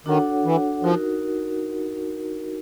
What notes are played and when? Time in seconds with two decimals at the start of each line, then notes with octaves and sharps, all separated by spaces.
0.06 D#3 D4 F#4 A4 C#5 F#5
0.45 E3
0.83 F3 D#4 F#4 A#4